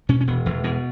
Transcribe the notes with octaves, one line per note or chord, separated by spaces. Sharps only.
B2 C#4
C#4
E1 B3
E1 E3
B2 E3